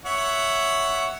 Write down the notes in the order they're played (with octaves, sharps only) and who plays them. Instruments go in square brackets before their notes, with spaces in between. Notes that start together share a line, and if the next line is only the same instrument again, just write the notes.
[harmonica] C#5 E5 F#5